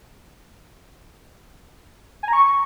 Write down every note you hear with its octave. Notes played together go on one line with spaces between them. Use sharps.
G#5
A#5
C#6